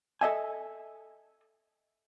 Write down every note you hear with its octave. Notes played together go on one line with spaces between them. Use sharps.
A4 D#5 E5 G#5